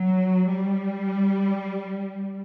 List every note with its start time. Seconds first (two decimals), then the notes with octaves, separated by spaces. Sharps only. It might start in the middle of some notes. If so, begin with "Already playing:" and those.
Already playing: F#3
0.49 G3